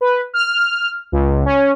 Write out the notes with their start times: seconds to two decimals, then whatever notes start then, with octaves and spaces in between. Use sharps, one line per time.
0.01 B4
0.34 F6
1.12 C#2
1.45 C#4